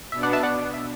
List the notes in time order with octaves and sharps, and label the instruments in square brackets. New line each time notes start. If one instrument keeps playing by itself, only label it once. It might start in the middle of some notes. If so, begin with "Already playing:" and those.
[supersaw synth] B2 B3 D4 [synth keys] E5
[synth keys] D5 F#5
E5 A5
D5 F#5
E5